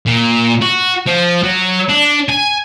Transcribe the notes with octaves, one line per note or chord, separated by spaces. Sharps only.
A#2
F#4
F3
F#3
D4
G#5